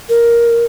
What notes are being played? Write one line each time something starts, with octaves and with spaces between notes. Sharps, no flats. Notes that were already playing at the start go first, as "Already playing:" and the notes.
A#4